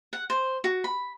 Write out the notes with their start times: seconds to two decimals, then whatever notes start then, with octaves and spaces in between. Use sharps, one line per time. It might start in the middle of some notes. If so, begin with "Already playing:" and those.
0.13 F#5
0.30 C5
0.64 F#4
0.84 B5